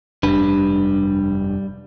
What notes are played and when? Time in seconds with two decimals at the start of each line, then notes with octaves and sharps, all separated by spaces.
0.23 F1 G2 G3 D4 B4